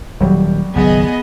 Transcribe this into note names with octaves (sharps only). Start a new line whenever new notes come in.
D#1 F#3 G3
F#1 B1 D#3 B3 G#4 D#5